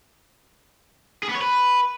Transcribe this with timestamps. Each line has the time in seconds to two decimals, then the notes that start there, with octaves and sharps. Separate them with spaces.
1.23 G#4
1.29 B3
1.35 C#5
1.41 B4